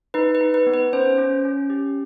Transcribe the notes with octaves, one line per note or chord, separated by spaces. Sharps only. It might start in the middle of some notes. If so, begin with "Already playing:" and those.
D#4 B4
B4
D#4
B4
B3
B4
C#4 C5
C#4
C#4
G4